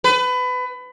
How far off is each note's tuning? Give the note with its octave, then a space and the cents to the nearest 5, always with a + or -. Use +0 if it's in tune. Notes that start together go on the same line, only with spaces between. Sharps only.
B4 +25